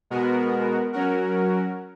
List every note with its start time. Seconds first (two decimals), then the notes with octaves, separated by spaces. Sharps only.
0.10 B2 G#3 B3 F#4 A#4
0.93 F#3 C#4 F#4 A#4